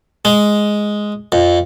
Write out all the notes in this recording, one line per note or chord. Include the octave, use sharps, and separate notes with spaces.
G#3
F2